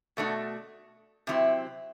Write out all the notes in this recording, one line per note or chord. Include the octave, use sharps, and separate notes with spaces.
B2 A3 D4 F#4
C3 F#3 C4 E4